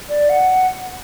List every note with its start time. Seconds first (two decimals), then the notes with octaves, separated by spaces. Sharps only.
0.09 D5
0.29 F#5